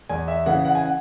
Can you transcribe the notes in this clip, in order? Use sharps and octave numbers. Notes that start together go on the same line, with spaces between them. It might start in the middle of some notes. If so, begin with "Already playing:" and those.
E2 G#5
E5
C#3 E3 F#5
F#5
G#5
F#5